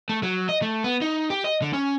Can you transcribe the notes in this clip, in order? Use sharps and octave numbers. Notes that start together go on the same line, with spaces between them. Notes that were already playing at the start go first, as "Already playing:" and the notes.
A3
F#3
D#5
A3
B3
D#4
G4
D#5
D3
C#4